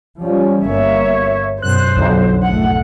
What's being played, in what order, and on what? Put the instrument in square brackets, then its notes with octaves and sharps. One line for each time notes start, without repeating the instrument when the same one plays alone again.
[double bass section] F3 G3 C#4
[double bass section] G1 A#3 [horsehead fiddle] C#5 E5
[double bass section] F#2 B2 [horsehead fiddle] C5 [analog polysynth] F#6
[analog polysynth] B1 F2 [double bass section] B2 D3 F#3
[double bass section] G#1 A3 [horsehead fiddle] F#5